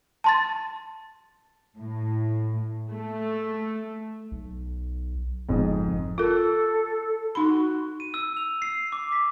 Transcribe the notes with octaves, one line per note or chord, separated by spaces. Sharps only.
A5 C6 A6
A2
A3
B1
F#1 F2 G#2
F4 A4 A#4
D#4 F#4 B5
D#7
E6
F7
C7
D6
B6